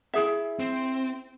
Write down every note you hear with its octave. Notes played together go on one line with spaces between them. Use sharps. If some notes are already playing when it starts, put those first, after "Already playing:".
E4 G#4 E5
C4